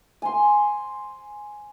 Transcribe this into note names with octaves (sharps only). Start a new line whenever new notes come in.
G#5 C6